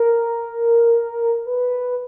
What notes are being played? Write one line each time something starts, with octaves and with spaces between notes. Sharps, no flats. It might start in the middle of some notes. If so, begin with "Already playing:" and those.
Already playing: A#4
B4